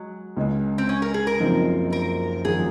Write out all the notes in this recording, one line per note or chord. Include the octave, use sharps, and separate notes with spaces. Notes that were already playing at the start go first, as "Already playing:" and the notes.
Already playing: F#3 G#3
C#2 C#3 G#3
C4
C#4
A#4
G#4
A#4
F#1 F#2 F3 C4 D#4
A#4
G#1 F#2 F3 A#3 G#4